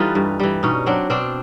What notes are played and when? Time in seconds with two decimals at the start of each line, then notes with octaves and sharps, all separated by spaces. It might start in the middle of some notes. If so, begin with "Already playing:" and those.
Already playing: E3 G3 D#4 F4 A4 B4
0.15 G2
0.40 E3 G3
0.63 B2 C#4 D#4
0.86 F#3 C4 D4
1.10 B2 C4 D4